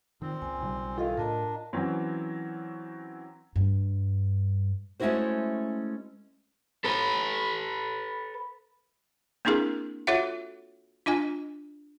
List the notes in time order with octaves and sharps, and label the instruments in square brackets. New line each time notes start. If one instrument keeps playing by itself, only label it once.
[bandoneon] A#2 C4 [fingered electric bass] D#3
[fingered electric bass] C#2 [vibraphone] G#5
[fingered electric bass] B1 C#3 G3
[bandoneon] D#3 E3 [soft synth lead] F4 [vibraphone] A4 D#5 F5
[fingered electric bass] A2 [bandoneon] D4 [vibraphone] A#4 D#5 A#5
[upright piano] E3 F#3 C4 C#4
[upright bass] G2
[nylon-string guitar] G#3 A3 C#4 E4 F#4 C5
[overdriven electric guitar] A4 B4
[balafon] A#3 C4 D4 E4 G#4 A#4
F4 F#4 A4 C#5 E5 F#5
D4 F4 D#5 G#5